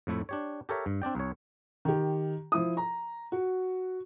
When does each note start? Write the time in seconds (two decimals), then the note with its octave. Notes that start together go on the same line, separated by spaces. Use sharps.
0.07 F2 A2 A3 E4
0.29 D4 G4 C#5
0.69 G4 A4 A#4 C#5 E5
0.86 G2
1.02 C4 D4 D5 G5
1.15 C2 C#5
1.85 D#3 G4
2.52 F3 E4 D#6
2.77 A#5
3.32 F#4